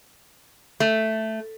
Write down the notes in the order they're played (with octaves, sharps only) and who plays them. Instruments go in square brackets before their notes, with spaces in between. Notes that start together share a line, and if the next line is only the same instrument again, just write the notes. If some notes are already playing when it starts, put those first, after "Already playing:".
[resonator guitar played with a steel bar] A3